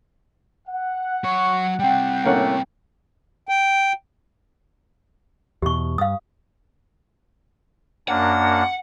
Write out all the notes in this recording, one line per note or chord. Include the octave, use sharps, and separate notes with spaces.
F#5
F#3 C#5 C#6
G3 C4 G5
A2 A3 A#3 C#4 F#5
G5
E2 B2 G4 C#6
G2 F5 D#6
F#2 A#3 D4 F#5